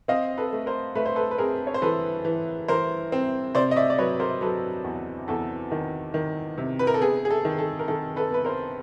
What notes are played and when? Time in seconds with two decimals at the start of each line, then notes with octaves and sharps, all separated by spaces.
0.08 C4 D#5 F5
0.38 A4 B4
0.53 A3
0.66 A#4 C5
0.95 A3 B4
1.06 C5
1.16 A4 B4
1.31 B4
1.38 C4 G#4 A#4
1.67 C#5
1.74 C5
1.82 E3 A4 B4
2.25 E3
2.68 E3 A#4 C5
3.12 C4
3.55 C3 C5 D5
3.71 D#5
3.76 D5 E5
3.90 D5
3.98 F#3 B4 C#5
4.20 A#4 C5
4.41 F#3 A4 B4
4.84 E2
5.28 E2 A4
5.72 D#3
6.14 D#3
6.58 C3
6.79 B4
6.87 A#4
6.94 A4
7.01 B3 G#4
7.25 G#4
7.30 A4
7.45 D#3
7.59 A4
7.79 A#4
7.88 D#3 A4
8.16 A4 B4
8.31 B3 B4
8.45 A#4 C5